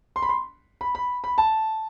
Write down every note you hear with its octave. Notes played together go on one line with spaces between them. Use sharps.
C6
B5
C6
B5
B5
B5
A5